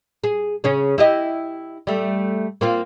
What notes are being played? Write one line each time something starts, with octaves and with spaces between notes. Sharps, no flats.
G#4
C#3 C#4 G#4
E4 G4 D#5
G3 A3
A#3 C4 F4